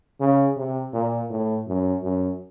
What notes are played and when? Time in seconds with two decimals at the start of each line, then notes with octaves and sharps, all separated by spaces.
0.20 C#3
0.57 C3
0.93 A#2
1.30 A2
1.67 F#2
2.03 F#2